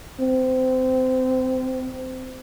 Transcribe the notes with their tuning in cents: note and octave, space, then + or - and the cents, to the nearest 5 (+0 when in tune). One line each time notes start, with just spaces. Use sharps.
C4 -25